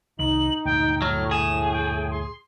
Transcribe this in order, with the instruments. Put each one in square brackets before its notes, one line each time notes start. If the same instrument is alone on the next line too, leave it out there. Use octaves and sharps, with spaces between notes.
[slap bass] C2 D#3 [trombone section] D#4 [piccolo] F#7
[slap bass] D2 G2 A#2 [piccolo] G5
[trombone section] A2 [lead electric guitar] F#3 [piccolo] F6
[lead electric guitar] G#4 [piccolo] E7
[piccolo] G5
C6